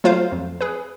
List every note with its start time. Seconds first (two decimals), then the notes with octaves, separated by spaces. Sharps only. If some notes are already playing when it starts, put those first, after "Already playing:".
0.04 F#3 G#3 A3 F4 C5 F5
0.32 F2
0.61 G#4 B4